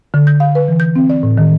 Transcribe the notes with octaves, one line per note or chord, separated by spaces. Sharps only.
D3
G6
F5
B4
E3
G6
C4
D5
A2
D#3